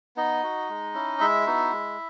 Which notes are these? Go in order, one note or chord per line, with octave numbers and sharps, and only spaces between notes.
B3 D#4 D#5
F#4
G#3
C#4 E4
G#3 E4 E5
B3 D#4 F#4
G#3